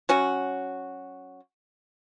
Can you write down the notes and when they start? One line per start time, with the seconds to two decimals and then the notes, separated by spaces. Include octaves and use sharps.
0.09 F#3 C#4 F#4